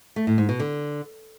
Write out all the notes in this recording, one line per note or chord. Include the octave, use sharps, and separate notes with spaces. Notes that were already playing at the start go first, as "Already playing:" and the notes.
A3
A2
G#2
B2
D3